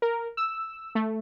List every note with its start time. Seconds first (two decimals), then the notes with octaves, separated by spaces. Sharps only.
0.02 A#4
0.37 E6
0.95 A3